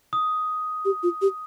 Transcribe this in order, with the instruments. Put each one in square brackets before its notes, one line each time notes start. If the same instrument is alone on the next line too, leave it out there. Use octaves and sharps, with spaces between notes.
[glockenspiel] D#6
[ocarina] G4
F4
G4